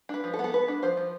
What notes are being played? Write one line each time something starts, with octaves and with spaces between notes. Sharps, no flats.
D4 B4
F3
A4
B3
A4
B3 B4
D4
F3 C5
F3